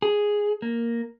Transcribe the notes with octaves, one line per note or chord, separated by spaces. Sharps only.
G#4
A#3